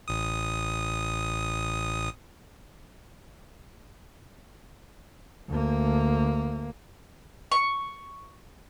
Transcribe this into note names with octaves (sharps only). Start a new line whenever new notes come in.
A1 D#6
D2 A#3
C#6